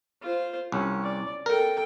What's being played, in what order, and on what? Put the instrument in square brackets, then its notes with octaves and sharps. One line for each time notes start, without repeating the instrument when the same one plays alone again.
[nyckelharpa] F4 C5
[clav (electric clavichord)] C2 [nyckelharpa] C#4
[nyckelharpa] D5
[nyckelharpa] A4 G5 [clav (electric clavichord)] A#4